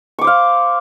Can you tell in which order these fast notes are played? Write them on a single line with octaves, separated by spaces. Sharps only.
C#6 D6 C5 F5